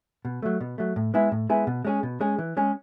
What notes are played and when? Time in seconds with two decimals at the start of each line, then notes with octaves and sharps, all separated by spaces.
0.25 B2
0.43 F#3 A3
0.61 B2
0.78 F#3 A3
0.96 A2
1.14 G#3 B3 E4 G#4
1.32 A2
1.49 G#3 B3 E4 G#4
1.67 B2
1.85 G#3 C#4 G#4
2.03 B2
2.21 G#3 C#4 G#4
2.39 E3
2.57 G#3 C#4 G#4